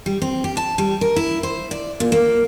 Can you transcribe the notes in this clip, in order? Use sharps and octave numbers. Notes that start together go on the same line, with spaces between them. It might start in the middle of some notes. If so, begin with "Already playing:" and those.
G3
C4
G4
A5
G3
A#4
E4
C5
D5
A#2
A#3